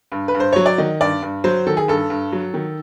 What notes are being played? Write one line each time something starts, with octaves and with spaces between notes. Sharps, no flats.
G2
B4
G2
C5
F#3 C#5
D5
D#3 D#5
G2 D5
G2
F#3 C5
D#3 A4
G#4
G2 A4
G2
F#3
D#3